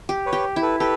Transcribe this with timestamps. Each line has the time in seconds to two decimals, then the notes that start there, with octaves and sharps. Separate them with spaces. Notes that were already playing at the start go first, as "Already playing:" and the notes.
0.09 G4
0.26 B4 C#5
0.33 G4
0.56 E4
0.62 A4 B4
0.80 G4 A4 B4